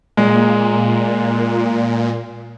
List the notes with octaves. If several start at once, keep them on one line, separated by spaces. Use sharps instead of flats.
A#2 G#3